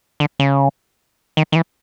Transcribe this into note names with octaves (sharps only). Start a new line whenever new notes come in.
D3
C#3
D#3
D#3
E3